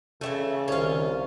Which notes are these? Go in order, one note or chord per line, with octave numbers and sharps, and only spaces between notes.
C#3 E3 G3 A3 A4
C2 D#3 C#4 F4